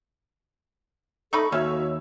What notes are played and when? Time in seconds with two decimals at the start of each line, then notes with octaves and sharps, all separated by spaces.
1.33 A3 D#4 A4 B5 C#6
1.52 D#2 C#4 F#4 C#5 E5 E6